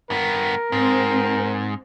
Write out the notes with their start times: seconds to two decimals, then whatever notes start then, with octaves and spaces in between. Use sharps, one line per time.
0.10 G2 B3 A#4
0.72 G#2 C4